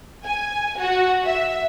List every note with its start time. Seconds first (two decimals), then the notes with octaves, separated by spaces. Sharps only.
0.24 G#5
0.78 F#4
1.25 E5